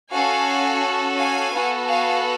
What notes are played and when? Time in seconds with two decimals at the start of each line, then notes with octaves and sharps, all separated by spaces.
0.12 C#4 F#4 A4 F5 G#5
1.17 F5 G#5
1.52 B3 F#4 A4
1.87 F5 G#5